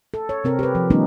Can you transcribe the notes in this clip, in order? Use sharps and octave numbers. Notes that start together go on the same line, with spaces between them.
A4
C#5
C3 C4 A#4
G4 B4
F3
D#3 G3 A3 B3 C#4 D#4